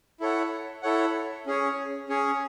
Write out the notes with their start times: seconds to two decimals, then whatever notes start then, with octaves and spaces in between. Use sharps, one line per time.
0.20 E4 A4 C#5 F#5
0.82 E4 A4 C#5 F#5
1.46 C#4 G#4 C#5
2.09 C#4 G#4 C#5